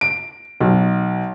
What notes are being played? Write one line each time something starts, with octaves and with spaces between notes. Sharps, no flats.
D7
B1